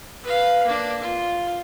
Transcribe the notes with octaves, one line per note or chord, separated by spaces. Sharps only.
B4 F5
A#3 D4
F4